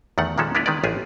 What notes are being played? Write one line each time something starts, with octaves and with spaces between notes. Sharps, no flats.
E2 D#3 A3 F#5
A#2 D#3 F3 G#3 C#4 A4
G#3 B3 D4 E4 A#4 B4
D#3 G#3 B4 D5
A1 F4 G4 G#4 G#5